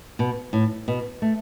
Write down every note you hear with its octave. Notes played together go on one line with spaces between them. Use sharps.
B2
A2
B2
A3